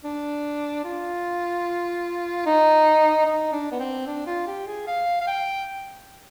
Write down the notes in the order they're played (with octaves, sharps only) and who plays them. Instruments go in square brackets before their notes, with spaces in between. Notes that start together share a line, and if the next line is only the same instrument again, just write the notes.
[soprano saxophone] D4
F4
D#4
D#4
D4
B3
C4
D4
F4
G4
G#4
F5
F5
G5